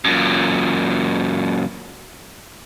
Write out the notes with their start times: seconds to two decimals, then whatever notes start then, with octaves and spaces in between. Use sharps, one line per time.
0.05 F#2 A#2